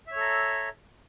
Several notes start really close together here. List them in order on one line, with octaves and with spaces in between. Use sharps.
E5 C#5 A4 A#5